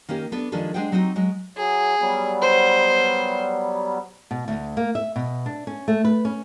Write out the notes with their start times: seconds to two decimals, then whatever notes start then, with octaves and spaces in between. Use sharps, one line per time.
0.09 D#3 A#3 C#4 G4
0.32 B3 D4 A4 B4
0.52 D#3 F3 G#3 D4 G#4 A4
0.74 G#3 D4 G#4 C5 F#5 G5
0.92 F#3 C4 D#4 F#4
1.16 F#3 G#3
1.57 F#3 G#4
2.01 F#3 G3 B3
2.42 C5
4.31 B2
4.48 D2
4.77 A#3
4.95 E5
5.16 B2
5.46 D4
5.67 C#4
5.88 A3
6.05 B4
6.25 C#4